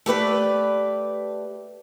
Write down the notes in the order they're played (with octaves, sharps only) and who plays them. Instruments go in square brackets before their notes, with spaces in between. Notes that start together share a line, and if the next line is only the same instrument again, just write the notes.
[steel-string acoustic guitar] A3 G4 B4 D5